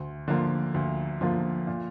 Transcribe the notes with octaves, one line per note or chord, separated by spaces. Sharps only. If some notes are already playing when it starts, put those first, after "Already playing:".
Already playing: D2
D3 F3 A#3 F4
D2
D3 F3 A#3 F4
A#2